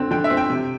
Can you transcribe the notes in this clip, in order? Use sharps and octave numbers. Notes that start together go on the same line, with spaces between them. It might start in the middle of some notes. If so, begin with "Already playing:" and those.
Already playing: D3 C4
D3 G5
E5
C4
G5
C3